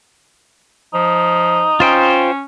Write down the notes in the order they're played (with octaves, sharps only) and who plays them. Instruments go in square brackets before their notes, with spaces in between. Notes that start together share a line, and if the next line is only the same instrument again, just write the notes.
[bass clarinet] F3 [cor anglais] D#4
[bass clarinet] C#4 [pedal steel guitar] F4 C5 G5